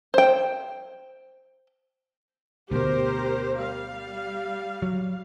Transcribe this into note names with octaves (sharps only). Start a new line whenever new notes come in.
C5 G5
D2 B2 G4 A#4 C5
G3 F5
F#3